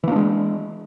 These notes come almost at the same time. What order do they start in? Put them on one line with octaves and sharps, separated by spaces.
E3 A#3 D4 G#3